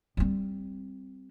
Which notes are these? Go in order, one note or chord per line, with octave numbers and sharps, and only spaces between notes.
G3 C4